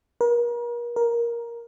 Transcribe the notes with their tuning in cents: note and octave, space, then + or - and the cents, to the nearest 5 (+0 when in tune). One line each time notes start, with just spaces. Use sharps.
A#4 +40
A#4 +10